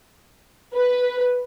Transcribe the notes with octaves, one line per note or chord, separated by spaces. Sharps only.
B4